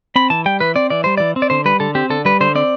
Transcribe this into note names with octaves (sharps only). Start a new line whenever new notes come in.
C4 B5
E3 A5
G3 G5
E3 B4
C4 D5
E3 D5
G3 C5
E3 D5
C4
D5
D3 C5
G3 B4
D3 A4
C4 G4
D3 A4
G3 B4
D3 C5
C4 D5